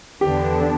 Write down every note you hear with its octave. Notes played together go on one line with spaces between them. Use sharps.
E2 D3 B3 D4 G4